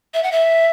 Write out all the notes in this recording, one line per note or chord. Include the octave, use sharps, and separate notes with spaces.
E5
F#5
E5